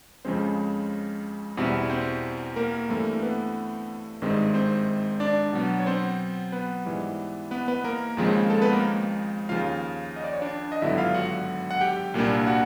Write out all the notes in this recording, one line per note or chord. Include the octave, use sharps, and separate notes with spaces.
F2 C#3 F3 G#3 C4 C#4 C5
E2 B2 G3 C4 E4
C4 C5
A#3 A#4
G2 E3 A3 C4
B3 B4
G#1 G2 D#3 G#3 C4
C4 C5
D4 D5
B2 F#3 B3
C#5
C4 C5
B3 B4
G#2 E3 G3
B3 B4
B3 B4
A#3 A#4
D#2 C#3 F3 G#3 C4
A4
B3 B4
A#3 A#4
D#2 C#3 F3 F4 F5
D#5
D5
C#5
D4 D5
D#5
G#1 G2 D3 F#3 B3 E4 E5
F4 F5
F#4 F#5
F#5
G4 G5
C2 A#2 G3 A#3 D4
F#4 F#5